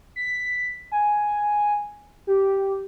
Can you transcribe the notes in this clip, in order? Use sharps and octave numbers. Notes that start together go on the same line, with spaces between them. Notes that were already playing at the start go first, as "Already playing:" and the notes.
B6
G#5
G4